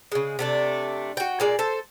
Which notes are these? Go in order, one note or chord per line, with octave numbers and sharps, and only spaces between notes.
C#3 G#3
C3 A3 D4
F#4 G5
A#2 G#3 D5
A4 C5